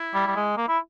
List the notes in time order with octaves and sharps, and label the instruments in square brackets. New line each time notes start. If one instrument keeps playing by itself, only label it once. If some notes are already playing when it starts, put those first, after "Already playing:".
Already playing: [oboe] E4
[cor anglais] G3
G3
G#3
A#3
E4